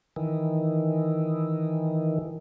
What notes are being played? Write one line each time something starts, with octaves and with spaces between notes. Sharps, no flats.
D#3 E3